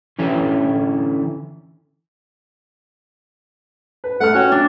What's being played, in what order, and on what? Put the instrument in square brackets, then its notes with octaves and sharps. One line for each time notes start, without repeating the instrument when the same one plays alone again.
[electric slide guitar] D3 E3 C#4 E4
[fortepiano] B4
[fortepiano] A3 F6 [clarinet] F#5
[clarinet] C#4 [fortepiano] F#4 C#5 G5
[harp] D4